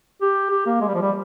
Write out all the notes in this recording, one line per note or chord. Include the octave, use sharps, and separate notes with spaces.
G4
G4
A#3
G#3
G3
F3
G3